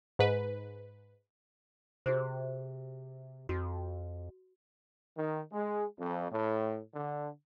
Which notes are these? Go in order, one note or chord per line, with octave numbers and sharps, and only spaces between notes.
G#2 B4
C3 F#4 G#4 C5
F2 F#4
D#3
G#3
F2
A2
D3